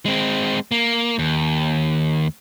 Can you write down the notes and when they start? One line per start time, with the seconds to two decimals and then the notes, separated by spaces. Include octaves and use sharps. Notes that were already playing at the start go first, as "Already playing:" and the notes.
0.06 G#3 C4
0.71 A#3
1.19 D#2